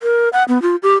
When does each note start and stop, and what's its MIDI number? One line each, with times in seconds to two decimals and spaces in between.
0.03 0.29 70
0.33 0.44 78
0.49 0.61 59
0.62 0.76 65
0.83 0.94 67